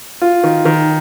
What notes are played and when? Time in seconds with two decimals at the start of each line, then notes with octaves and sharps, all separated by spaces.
0.22 F4
0.44 D#3
0.65 D#3